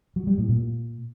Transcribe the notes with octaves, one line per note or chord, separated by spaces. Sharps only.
F#3
G3
A2
A#2